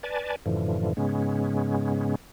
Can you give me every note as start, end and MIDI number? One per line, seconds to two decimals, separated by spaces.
0.03 0.36 71
0.03 0.36 74
0.03 0.36 80
0.03 0.36 81
0.46 0.93 42
0.46 0.93 45
0.46 0.93 50
0.46 0.93 52
0.46 0.93 53
0.97 2.15 44
0.97 2.15 49
0.97 2.15 56
0.97 2.15 59
0.97 2.15 61